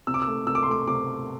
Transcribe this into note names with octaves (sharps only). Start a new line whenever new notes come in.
C3 E6
D6
E6
A3
C3 E6
D6
C6
A3 D6
C3 D6